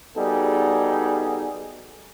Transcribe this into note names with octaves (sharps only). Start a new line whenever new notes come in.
G3 B3 D#4 F#4 G#4 A4